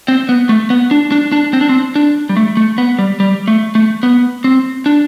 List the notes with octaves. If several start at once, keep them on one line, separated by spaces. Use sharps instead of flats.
C4
B3
A3
B3
D4
D4
D4
C4
D4
C4
D4
G3
A3
A3
B3
G3
G3
A3
A3
B3
C4
D4